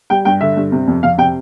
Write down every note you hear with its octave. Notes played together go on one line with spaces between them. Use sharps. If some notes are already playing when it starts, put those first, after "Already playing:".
G3 G5
G2 G5
D3 E5
G2
C3
F2
F2 F5
C3 G5